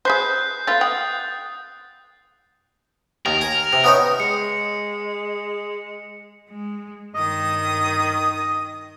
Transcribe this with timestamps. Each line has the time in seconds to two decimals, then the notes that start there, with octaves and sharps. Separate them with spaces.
0.05 G#4 B4 C5 F#6 G6 C7
0.67 A3 B3 F4 A6
0.81 F#5 G5 D#6
3.26 D#2 A#4
3.41 G#5
3.73 C3
3.84 B3 C#4 D#4
4.20 G#3 C#7
6.48 G#3
7.14 G2 D#3 D#5 D#6